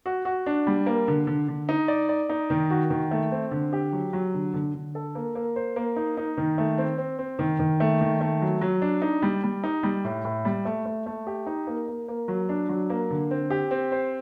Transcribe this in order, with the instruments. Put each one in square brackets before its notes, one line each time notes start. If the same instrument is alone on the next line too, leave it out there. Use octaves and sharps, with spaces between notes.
[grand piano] F#4
F#4
D4
G3
A#3
D3
D3
D3
D#4
D5
D5
D#4
D#3
F#4
D#3
A3
C4
D3
G4
F#3
F#3
D3
D3
D3
A4
A#3
A#3
C5
A#3
D#4
D#4
D#3
A3
C4
C4
C4
D#3
D#3
A3
D#3
A3
F#3
F#3
D4
D#4
G3
G3
D#4
G3
A2
A2
G3
A3
A3
A3
G4
D#4
A#3
A#3
A#3
F#3
D4
F#3
A#3
D3
C4
G4
C4
C5